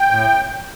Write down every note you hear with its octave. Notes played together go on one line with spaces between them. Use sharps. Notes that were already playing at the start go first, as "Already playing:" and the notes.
Already playing: G5
A2